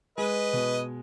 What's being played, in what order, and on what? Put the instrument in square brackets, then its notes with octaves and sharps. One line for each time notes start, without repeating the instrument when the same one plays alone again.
[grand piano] G#3 [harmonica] B4 D#5
[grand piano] B2